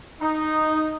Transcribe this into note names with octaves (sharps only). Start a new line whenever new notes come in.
D#4